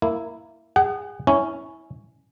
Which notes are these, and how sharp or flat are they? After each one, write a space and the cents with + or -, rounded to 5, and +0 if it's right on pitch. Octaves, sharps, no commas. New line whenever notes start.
A#3 -10 E4 +0
G#4 -25 F#5 +35
C#4 +0 E4 -20